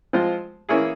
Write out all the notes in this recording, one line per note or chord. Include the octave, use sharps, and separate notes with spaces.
F3 G#3 C4 F4 C5
E3 A#3 C#4 E4 G#4